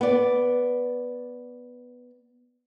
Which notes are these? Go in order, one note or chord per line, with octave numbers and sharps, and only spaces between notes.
B3 D5